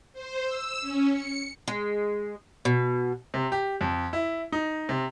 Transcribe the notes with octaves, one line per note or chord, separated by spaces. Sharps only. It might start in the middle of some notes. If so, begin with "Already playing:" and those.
C5
E6
C#4
C#7
G#3
B2
C3
G4
F2
E4
D#4
C3